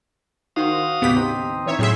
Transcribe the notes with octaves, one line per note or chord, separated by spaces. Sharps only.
D#3 F#4 C5 F5 D#6
D#2 A2 C#3 B3 G4 B6
C4 D#4
E3 C#5 E5
A2 F#3 C4 G#4 E5 C6